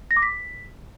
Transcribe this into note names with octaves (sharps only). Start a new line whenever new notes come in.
A#6
D6
B6